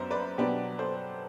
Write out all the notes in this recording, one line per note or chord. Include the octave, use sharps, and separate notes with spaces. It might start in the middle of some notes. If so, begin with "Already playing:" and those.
Already playing: F#2 F#3 B3 D4 C5
B4 D5
B2 F#3 B3 D4 G4 B4
A4 C5